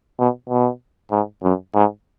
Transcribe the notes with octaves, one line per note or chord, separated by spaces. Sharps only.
B2
B2
G#2
F#2
G#2